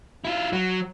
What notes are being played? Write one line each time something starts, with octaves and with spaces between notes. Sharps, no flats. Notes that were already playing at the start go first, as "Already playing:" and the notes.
E4 F4
F#3